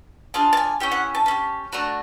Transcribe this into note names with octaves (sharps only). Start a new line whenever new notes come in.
D4 F4 G#4 A5
A5
G#5
C#4 E4 G4 G5
F#5
A5
C#4 E4 G4
A3 D4 F#4 A#5